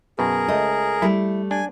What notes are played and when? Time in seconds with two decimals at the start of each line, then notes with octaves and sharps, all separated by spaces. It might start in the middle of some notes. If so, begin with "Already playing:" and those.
0.19 F#2 B2 G#4 A#4
0.48 C#2 A3 D#5
1.02 G3 A3 E4
1.51 D4 G#5